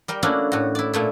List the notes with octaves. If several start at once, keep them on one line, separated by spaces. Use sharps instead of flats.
G3 A#4 G5
A3 A#3 C#4 D4 E4 F#4
A2 F#4
E4 D5
A#2 A3 E4